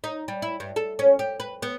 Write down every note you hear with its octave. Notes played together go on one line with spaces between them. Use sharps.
D#4
G3
E4
G2
A4
C#4
G4
B4
B3